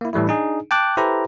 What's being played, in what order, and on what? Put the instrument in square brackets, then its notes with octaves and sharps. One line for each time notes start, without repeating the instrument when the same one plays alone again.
[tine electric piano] A#3 E4
A2 E3 G3 A3 E4
D4 D#4 G#4
G5 A5 D6 F#6
E4 G4 A4 B4 C5 A#5